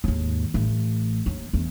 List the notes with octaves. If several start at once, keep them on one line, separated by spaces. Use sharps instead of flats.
D#2 G#2
A1
D#2
E2